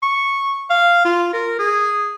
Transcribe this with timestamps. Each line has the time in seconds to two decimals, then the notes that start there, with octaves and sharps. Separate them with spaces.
0.03 C#6
0.70 F5
1.05 F4
1.33 A#4
1.59 G#4